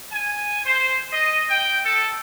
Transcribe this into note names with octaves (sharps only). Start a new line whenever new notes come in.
G#5
C5
D#5
G5
A4